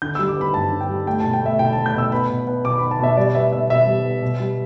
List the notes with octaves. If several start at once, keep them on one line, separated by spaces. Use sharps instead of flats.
D3 G6
G3 E6
D6
B3 B5
G2 A5
D3
G5
G3
A3 G5
B2 A5
G5
A3 E5
B2 G5
A3 A5
G6
B2 E6
B3 B5
B2
B3
B2 D6
B3 B5
A5
B2 E5
G3 D5
B3 E5
B2 E5
B2 E5
G3
B3
B2
G3